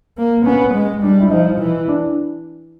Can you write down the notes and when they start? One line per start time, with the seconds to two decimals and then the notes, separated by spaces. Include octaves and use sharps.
0.18 A#3
0.45 B3 C#4
0.74 G#3
1.02 G3 D4
1.20 E4
1.31 F3 D#4
1.59 E3
1.88 D4